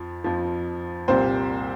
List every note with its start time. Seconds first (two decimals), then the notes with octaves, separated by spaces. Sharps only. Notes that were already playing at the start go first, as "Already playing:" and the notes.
Already playing: F2 F3
0.24 F2 F3
1.08 C2 A#2 G3 C4 C5